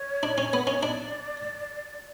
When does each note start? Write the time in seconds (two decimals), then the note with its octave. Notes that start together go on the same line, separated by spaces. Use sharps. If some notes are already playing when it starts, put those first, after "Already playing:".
Already playing: C#5
0.23 D4
0.38 C#4
0.53 B3
0.67 C#4
0.83 D4 D5